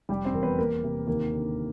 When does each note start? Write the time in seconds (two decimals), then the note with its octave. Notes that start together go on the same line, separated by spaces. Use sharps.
0.09 F1 G3 G4
0.25 C4 C5
0.33 E2 A#4
0.42 B3 B4
0.59 E2 A#3 A#4
0.84 C3
1.07 D#2 A#3 A#4
1.32 D3